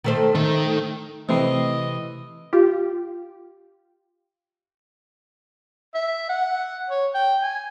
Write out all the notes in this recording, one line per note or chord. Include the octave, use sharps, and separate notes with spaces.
D#3 A3 C5
D#3 A3
C3 E3 A3 C4 D#5 C7
F4 G4
E5
F#5
C#5
G5
G#5